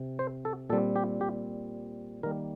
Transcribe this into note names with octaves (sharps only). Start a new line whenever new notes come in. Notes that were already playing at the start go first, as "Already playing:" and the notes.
Already playing: C3
C5
A4
A#2 G3 C4 A4
G4
G4
D#3 G3 A#3 A#4